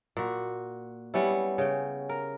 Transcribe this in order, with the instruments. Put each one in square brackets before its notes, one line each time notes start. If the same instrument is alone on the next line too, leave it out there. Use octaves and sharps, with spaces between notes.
[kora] A#2 F#4
G3 B3 C#4 E4
C#3 G5
A#4